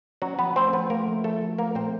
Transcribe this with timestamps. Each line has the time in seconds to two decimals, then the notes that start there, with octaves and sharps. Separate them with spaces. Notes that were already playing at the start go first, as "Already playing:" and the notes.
0.22 F#3 C#4 F#4
0.39 F3 B3 B4
0.56 A3 C4 C5
0.73 F3 B3 B4
0.90 A3 A#3 A#4
1.08 F3
1.24 F3 A3 A4
1.42 F3
1.58 A3 A#3 A#4
1.75 A#2 C4 C5